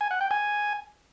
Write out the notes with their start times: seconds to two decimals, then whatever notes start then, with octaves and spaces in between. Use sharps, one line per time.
0.01 G#5
0.11 F#5
0.21 G5
0.31 G#5